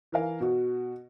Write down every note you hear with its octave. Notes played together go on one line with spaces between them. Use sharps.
E3 A#4 F5 G#5
B2 F#4